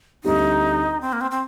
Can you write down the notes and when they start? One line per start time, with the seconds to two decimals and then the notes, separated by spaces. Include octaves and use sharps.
0.24 D2 D3 G3 C4 D#4 G4
1.01 C4
1.13 A#3
1.21 C4
1.31 C4